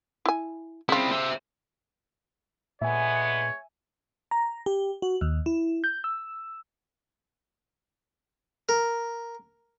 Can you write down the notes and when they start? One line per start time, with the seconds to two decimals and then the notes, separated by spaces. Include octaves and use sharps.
0.26 E4 G#5
0.89 C#3 C4 E4 F4
1.11 C5 E5
2.82 A#2 D3 G#3 B3 C#5 E5 G#5
4.31 A#5
4.66 G4
5.02 F#4
5.21 D#2
5.46 E4
5.84 G6
6.04 E6
8.69 A#4